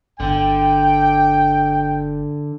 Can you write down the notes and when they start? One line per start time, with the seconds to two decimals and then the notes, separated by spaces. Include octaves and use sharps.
0.20 G1 D3 G5